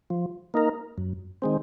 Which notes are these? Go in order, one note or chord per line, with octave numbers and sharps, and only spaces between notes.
F3
A#3 D#4 A#4
F#2
D#3 G#3 C4